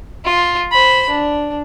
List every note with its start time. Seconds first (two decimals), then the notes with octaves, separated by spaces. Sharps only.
0.25 F4
0.72 C5 B5
1.09 D4